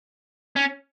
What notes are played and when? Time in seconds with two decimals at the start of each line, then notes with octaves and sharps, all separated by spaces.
0.56 C#4